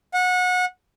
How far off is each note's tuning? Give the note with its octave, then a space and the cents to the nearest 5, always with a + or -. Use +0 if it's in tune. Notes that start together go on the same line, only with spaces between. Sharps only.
F#5 -25